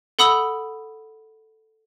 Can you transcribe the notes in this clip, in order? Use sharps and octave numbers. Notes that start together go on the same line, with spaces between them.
A4 F#5 B5 D#6 E6 F#7